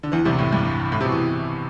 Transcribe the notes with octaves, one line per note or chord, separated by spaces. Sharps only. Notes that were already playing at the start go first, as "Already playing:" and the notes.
D3
E2 E3
C2 C3
A2
G2
A2
C3
B2
E3